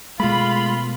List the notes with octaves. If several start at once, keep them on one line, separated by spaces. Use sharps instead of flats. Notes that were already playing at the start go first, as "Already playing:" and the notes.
B2 G#3 A3 F4 B5